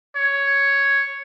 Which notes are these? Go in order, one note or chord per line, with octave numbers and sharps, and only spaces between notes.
C#5